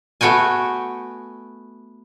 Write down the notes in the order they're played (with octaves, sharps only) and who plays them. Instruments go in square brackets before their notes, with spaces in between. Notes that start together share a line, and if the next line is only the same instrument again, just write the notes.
[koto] A3 B3 F#4 G5 G#5